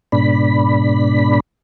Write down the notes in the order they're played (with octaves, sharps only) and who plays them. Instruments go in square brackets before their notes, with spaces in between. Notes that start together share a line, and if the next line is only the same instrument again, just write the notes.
[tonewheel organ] G#2 B2 D4 B5